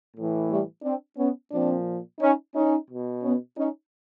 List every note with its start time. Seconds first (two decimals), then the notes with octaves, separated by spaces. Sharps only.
0.15 A2 E3
0.49 G3 A3
0.83 C4 D4
1.17 B3 C#4
1.52 A#2 F3 C4 D4
2.20 C#4 D#4
2.54 C#4 D#4
2.89 B2
3.23 B3 C#4
3.57 C#4 D#4